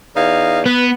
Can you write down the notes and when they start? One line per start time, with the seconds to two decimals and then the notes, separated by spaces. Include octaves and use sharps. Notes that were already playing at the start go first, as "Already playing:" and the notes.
0.15 E2 D#4 F5
0.66 B3 B4